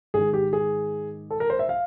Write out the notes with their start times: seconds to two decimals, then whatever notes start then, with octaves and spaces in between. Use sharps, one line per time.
0.14 G#2 D#3 G#4
0.34 G4
0.53 G#4
1.31 A4
1.40 A#4
1.50 C5
1.59 E5
1.69 F5